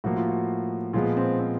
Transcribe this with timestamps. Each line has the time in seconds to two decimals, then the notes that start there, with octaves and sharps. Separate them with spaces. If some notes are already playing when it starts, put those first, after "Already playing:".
0.04 A2 F3 A#3 F#4
0.17 F4
0.29 F#4
0.93 A#2 F3 G#3 B3 F4
1.17 C4
1.39 C4